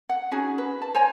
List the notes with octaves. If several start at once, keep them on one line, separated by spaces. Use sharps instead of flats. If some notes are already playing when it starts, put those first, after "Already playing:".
F#5
C#4 D#4 F#4 G#4
B4
A5
C5 C#5 G#5 A#5